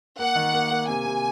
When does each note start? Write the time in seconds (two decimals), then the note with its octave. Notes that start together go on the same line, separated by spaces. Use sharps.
0.19 A#3 F#5
0.35 D#3
0.54 A#3
0.71 A#3
0.88 C3 G#5
1.06 C3